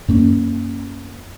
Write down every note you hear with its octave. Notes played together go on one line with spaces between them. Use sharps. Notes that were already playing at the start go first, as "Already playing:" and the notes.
F#2 A#3 C#4